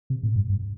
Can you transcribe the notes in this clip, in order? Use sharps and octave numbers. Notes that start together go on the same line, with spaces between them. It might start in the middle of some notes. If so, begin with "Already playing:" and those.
C3
A2
G2
G2